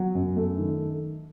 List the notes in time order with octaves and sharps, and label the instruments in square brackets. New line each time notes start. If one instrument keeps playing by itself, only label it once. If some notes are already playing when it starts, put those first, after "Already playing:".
Already playing: [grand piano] F#3
F#2
A3
D#3